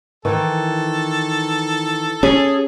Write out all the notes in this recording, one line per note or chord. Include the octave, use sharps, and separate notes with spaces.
D#3 E3 A4
C#4 G#4